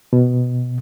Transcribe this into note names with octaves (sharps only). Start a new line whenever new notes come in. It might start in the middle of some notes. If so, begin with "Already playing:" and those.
B2